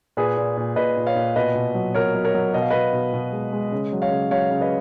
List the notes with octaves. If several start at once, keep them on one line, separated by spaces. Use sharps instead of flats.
A#2 G#4 B4
A#2
A#2
A#2 B4 D#5
A#2
C#5 F5
A#2
B2 B4 D#5
B2
F#3
B2 A#4 C#5
F#3
A#4 C#5
F#3
B2 D#5
F5
B2 B4 D#5
B2
B2
G#3
G#3
C#3
F#3
C#5 F5
C#3
F#3 C#5 F5
C#3
B4 D#5